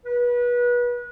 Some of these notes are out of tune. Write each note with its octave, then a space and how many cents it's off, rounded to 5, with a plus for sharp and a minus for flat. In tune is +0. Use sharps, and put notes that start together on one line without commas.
B4 -30